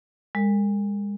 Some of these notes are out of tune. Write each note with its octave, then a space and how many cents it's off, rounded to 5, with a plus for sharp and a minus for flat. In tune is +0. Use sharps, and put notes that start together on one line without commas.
G#3 -35 A#4 -40